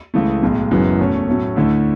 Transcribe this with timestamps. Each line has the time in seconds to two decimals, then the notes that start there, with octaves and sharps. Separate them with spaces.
0.14 C#2 C#3 E3 A3
0.42 B1 A2 G#3
0.71 F#1 F#2 E3 G#3 B3
0.99 E2 B2 A3 C#4
1.27 A2 F#3 A3 C#4
1.56 D2 D3 A3 E4